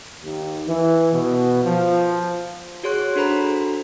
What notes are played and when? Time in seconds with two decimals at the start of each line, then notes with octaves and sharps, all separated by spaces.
0.21 D#2
0.65 E3
1.12 B2
1.63 F3
2.83 F#4 G#4 C#5 C6 F#6
3.16 D4 F#4 A4 C5 A#5 B5